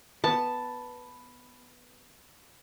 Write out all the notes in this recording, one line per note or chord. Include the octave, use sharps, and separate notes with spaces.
B3 A5